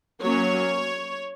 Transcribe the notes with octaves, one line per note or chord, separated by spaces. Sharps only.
F#3 A#3 C#4 C#5